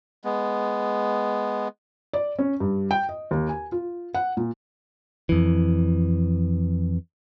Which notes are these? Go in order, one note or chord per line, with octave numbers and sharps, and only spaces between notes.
G#3 B3
D5
C#4
G2
G5
D#5
D#2
G#5
F4
F#5
A#2
F2 E3